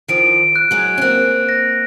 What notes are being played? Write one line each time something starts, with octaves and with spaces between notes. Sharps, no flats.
D#3 F3 D7
F#6
F#3 G#3
C#4
A#3 C4 F#6
A#6